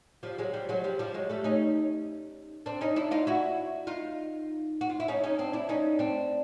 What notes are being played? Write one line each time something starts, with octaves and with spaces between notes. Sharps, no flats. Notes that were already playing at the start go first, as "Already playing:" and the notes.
F3 G3
F#3 G#3
F3 G3
F#3 G#3
F3 G3
F3 G3
F#3 G#3
G3 A3
C#4 D#4
C4 D4
C#4 D#4
D4 E4
D#4 F4
E4 F#4
D#4 F4
F#4
F4
E4
C#4 D#4
C#4 D#4
C4 D4
D4 E4
C#4 D#4
C4 D4